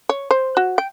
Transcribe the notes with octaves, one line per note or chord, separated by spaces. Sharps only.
C#5
C5
F#4
G5